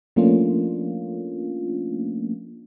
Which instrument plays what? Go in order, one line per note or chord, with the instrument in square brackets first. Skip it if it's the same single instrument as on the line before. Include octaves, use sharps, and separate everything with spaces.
[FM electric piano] F3 A3 A#3 C#4 D4 F4